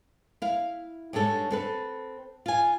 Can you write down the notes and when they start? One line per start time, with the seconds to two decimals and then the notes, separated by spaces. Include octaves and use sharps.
0.42 E4 F5
1.13 G2 G#3 D4 A4 C#5
1.50 C4 A4 B4
2.46 F4 G#5